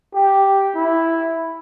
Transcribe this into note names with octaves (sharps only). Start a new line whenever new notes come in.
G4
E4